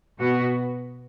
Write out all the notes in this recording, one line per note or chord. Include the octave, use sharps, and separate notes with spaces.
B2 B3 F#4